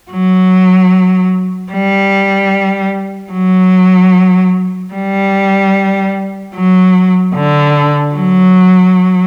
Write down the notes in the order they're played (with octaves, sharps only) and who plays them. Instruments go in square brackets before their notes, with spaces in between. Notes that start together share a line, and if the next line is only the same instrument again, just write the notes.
[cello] F#3
G3
F#3
G3
F#3
D3
F#3